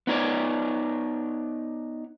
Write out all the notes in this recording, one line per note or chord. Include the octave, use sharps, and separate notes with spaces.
B3 D#4 C#5 D5